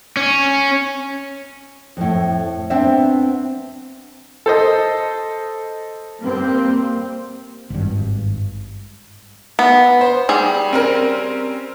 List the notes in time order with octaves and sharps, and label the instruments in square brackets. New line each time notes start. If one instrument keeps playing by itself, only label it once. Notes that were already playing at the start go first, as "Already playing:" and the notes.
[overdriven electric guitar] C#4
[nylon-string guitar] F2 A2
B3 C4 D4 C5 E5
[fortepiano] A4 C5 D#5
[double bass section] G3 A#3 C4
[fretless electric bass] G#1 G2
[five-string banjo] B3
[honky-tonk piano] C5
[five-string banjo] G3 G#4
[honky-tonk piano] C4 C#4 A#4